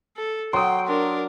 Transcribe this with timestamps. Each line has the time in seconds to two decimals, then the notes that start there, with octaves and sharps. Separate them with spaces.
0.17 A4
0.53 F#3 G5 C6 D#6
0.87 D4 A#4